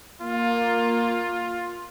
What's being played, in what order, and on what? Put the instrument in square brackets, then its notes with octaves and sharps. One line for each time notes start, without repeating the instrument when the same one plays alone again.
[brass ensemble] A#3 [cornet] F4